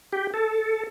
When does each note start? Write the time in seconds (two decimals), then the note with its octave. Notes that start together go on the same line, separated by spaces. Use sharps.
0.13 G4
0.34 A4